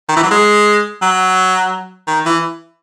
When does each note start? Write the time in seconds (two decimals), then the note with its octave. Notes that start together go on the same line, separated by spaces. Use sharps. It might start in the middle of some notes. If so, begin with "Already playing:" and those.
0.08 D#3
0.16 E3
0.23 F#3
0.31 G#3
1.02 F#3
2.07 D#3
2.26 E3